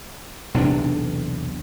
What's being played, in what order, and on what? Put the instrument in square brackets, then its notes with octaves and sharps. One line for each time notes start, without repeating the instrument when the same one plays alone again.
[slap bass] B1 E2 C3 D4